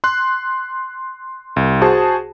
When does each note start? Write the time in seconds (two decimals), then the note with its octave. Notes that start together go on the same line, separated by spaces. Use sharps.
0.04 C6 F#6
1.56 C2
1.81 F#4 G#4 C5 A5